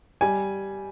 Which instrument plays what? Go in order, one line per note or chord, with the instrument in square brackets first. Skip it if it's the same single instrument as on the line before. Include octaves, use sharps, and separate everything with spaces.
[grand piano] G3 G#5